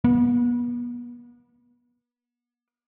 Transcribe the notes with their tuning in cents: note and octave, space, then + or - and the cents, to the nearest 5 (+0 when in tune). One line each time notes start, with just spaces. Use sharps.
B3 -35